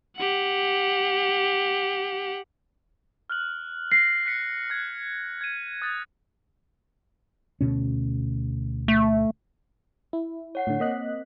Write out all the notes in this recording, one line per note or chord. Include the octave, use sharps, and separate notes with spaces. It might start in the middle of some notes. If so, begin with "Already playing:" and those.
G4 F#5
F6 F#6 F#7
A#6 C7
F#6 B6 C#7
F#6 G#6
G#6 D#7
D#6 F#6 A6
D2 B2 C#4
A3
E4
C#5 F#5 C7
A2 D3
A#3 C4 D#5 F#6 B6